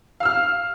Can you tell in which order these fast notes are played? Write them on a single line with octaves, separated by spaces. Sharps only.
F5 E6 F6